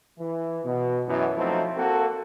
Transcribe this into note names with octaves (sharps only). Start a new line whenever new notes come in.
E3
B2
F#2 B2 E3
F3 F#3 A3 C4 D#4 E4
A#3 C4 F#4 A4